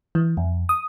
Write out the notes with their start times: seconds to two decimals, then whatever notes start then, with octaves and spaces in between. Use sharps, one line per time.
0.15 E3
0.37 F2
0.69 D#6